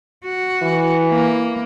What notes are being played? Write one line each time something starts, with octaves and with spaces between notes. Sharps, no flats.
F#4
E3
A#3